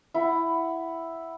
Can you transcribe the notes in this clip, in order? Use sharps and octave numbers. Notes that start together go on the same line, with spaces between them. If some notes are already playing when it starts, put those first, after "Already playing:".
E4 F#5